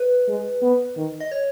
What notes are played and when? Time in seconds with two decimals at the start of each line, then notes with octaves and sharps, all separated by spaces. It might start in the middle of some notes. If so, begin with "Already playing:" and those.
Already playing: B4
0.28 G#3
0.62 B3
0.97 D#3
1.20 D#5
1.32 C#5